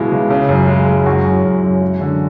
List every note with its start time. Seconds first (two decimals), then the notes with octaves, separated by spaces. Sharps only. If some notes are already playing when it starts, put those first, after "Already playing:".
Already playing: C#2 B2 G#3 E4
0.11 C#2
0.30 C#3
0.49 F#2
0.67 G#3
0.87 G#3
1.06 F#2 F#4
1.24 F#2
1.44 F#2
1.62 F#2
1.82 G#3
2.01 D3